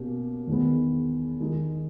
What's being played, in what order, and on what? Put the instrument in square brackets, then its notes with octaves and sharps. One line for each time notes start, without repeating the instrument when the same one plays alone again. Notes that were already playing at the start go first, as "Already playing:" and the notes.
Already playing: [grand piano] B2 A#3 C#4 G4
E2 D#3 G#3 B3
D#3 G#3 D#4 G4